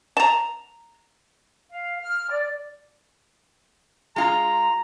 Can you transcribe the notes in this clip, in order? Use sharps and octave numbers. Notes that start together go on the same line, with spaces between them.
A5 A#5
F5
F6
D5
G#3 F4 A#5